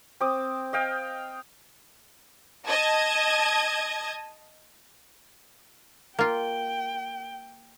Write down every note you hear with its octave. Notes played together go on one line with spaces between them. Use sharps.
C4 D6 D#6
D#5 F5 G5
D#5 A5 D#6 G#6
A#3 F4 G5